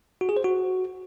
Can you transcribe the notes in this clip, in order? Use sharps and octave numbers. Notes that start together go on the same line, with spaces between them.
F#4
G#4
C5
F#4